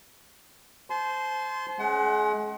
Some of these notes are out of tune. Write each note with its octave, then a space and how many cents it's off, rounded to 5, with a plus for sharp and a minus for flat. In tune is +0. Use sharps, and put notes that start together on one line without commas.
C5 -5 A5 -40 C6 -10
G#3 +35 C#4 +0 F#5 +40